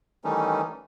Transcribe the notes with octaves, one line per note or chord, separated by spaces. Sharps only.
D#3 E3 G3 A3 C#4 D#4